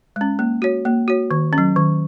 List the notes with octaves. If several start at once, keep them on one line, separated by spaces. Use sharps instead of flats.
G#3 C#4
A#3
F#4 C#5
A#3
F#4 C#5
D#3
C#4
F#3
D#3